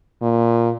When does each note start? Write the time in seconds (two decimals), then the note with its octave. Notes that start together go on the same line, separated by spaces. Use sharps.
0.22 A#2